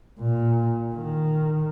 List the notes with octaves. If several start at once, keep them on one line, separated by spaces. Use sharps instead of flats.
A#2
D#3